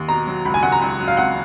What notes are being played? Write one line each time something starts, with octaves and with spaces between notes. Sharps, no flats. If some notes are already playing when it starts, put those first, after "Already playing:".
Already playing: D#2
B2 A#5
F#3
C#2 B5
G#5
C#2 F#5
A#5
C#2
F#3
F5
C#2 F#5